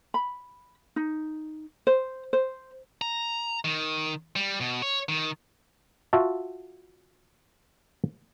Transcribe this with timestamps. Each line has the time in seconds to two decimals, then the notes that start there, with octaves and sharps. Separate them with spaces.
0.14 B5
0.96 D#4
1.87 C5
2.33 C5
3.02 A#5
3.65 D#3
4.36 G3
4.61 B2
4.82 C#5
5.09 D#3
6.13 F4 F#4 E5 A5